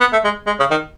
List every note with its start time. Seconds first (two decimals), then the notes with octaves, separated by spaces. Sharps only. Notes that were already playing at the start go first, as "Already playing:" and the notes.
0.01 B3
0.12 A3
0.24 G#3
0.47 G#3
0.60 C#3
0.71 D#3